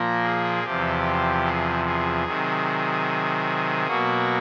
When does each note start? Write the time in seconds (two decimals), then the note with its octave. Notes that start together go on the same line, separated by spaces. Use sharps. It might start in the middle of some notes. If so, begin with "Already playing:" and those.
Already playing: A#2 F3 A#3 A#4
0.23 G#4
0.64 E2 C3 F3 G4
1.45 G#4
1.85 G#4
2.26 C3 D#3 F#3
3.87 B2 F#3 A#3 F#4